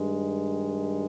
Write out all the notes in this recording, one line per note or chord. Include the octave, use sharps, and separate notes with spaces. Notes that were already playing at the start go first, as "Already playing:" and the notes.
Already playing: G2 D#3 G#3